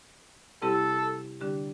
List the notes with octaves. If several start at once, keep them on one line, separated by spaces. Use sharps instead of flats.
C3 G3 C4 E4 G4 A4
D3 G3 D4 G4